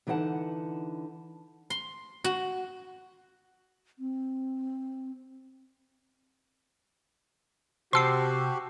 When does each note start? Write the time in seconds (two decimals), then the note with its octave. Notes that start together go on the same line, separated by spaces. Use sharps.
0.07 D3 E3 D#4 D#5 F#5 A5
1.70 C6
2.24 F#4
3.99 C4
7.93 C3 F#4 G4 C5 A5 C6 E6 C7